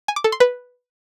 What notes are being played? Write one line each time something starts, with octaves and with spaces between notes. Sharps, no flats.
G#5
D6
A4
C6
B4